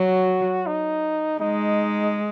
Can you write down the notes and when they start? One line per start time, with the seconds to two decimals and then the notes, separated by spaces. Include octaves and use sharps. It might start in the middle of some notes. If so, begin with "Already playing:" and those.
Already playing: F#3 F#4
0.67 D#4
1.40 G#3 D#4